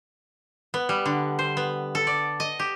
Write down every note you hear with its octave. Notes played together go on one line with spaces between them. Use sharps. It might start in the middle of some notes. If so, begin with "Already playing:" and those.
B3
G3
D3
C5
B3
A4
D5
D#5
G4